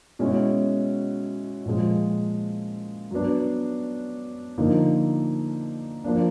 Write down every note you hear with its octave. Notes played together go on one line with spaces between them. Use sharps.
B2 G#3 C#4 E4
A#2 F3 G#3
F#3 B3 D4
D3 F3 A#3 D#4
F3 A#3 D4